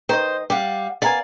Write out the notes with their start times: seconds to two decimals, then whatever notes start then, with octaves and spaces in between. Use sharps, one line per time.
0.09 D#3 C5 D#5
0.50 G3 G4 F5 F#5
1.02 B3 A#4 D5 F5 G#5